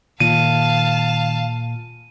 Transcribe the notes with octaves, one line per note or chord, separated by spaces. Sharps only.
A#2 D#3 F5 A5 D#7